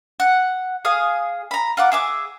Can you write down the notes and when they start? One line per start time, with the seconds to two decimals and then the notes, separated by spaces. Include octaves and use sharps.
0.20 F#5
0.85 G#4 F5 D#6
1.51 A#5 B5
1.77 F4 F#5 D6
1.92 G#4 E5 D6